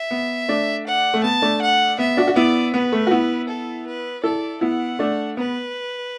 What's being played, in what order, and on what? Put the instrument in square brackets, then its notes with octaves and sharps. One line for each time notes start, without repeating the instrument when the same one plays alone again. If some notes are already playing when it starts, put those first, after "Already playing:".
Already playing: [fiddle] E5
[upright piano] B3
A3 D4
[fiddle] F#5
[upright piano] A3
[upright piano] B3 [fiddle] A5
[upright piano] A3 D4
[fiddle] F#5
[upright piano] B3 [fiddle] E5
[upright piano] D4 F#4
F#4
[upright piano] B3 E4 [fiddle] D5
[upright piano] B3 [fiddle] B4
[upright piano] A3
F#4
B3 E4
[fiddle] A4
B4
[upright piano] E4 A4 [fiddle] D5
[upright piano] B3 E4 [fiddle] F#5
[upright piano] A3 D4
[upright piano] B3 [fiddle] B4